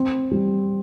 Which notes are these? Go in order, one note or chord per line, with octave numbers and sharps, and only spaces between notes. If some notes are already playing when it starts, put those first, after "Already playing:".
Already playing: C4
G3